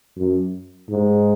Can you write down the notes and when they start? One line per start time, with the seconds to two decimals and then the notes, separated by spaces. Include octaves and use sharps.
0.17 F#2
0.89 G#2